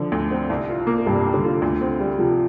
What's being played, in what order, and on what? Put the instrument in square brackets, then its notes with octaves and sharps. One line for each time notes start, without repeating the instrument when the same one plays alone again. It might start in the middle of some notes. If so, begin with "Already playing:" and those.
Already playing: [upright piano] D3 F3
D2
C4
C2
F4
A#3
[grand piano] G2 [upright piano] C3
[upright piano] C2
[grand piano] D3
[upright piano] F4
D2
C4
G3
[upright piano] C3 [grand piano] F3